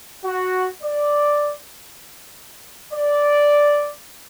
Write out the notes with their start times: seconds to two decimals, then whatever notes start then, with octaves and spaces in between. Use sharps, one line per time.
0.25 F#4
0.82 D5
2.93 D5